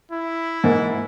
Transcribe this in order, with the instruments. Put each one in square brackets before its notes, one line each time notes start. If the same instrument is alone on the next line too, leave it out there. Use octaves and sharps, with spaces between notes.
[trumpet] E4
[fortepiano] G#2 A#3 F#5